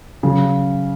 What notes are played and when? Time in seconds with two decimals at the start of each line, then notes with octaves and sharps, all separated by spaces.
0.23 C#3 F#3